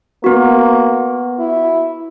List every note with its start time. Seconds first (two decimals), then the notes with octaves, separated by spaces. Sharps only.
0.24 A#3 B3 F#4
1.39 E4